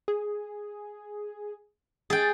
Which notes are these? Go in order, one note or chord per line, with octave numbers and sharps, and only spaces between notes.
G#4
G#4 G5 A6